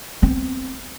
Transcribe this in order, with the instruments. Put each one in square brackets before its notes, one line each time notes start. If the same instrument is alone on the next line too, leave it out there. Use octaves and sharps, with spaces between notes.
[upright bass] B3 C4